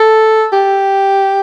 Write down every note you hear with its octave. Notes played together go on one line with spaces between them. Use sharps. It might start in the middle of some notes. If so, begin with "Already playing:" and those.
Already playing: A4
G4